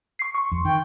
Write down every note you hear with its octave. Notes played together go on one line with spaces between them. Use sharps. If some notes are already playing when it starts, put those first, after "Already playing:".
C#6 C7
C6 C#6
F2
D#3 G5